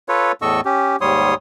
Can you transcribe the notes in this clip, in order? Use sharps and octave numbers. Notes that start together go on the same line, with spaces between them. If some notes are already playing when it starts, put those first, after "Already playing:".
F4 A4 B4 C#5
E2 A2 A4 D#5 C#6 E6
C#4 G4
D#2 G#2 G3 C#5 C6 D#6